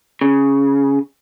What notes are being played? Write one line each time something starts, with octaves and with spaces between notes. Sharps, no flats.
C#3